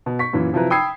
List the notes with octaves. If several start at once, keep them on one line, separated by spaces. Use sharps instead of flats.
B2
C#6 B6
F#2 A#2 E3
C3 F3 F#3 E4 B4 A#5
G5 B5 D#6 E6 G#6 C7